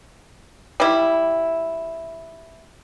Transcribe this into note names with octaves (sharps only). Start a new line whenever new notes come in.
G3 E4